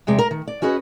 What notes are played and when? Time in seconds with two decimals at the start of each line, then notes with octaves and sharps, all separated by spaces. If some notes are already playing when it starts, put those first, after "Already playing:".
0.07 E2 C3 G#3 G5
0.19 A#4
0.31 D#3
0.48 D5
0.62 C#4 F#4 G#4 B4 D#5